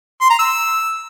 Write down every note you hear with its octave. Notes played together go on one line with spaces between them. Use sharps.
C6
A#5
E6